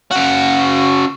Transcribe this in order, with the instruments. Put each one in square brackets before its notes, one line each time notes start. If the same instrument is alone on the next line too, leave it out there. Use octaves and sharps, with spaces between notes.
[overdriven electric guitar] C#3 F#4